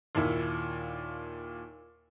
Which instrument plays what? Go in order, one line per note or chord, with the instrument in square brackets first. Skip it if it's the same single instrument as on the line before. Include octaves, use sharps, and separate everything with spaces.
[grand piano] D#2 A#2 E4